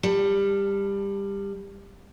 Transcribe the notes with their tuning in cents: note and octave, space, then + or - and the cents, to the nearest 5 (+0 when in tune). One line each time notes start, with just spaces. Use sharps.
G3 +20 A5 +25